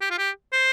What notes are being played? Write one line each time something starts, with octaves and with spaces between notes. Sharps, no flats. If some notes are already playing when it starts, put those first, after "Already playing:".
G4
F4
G4
C5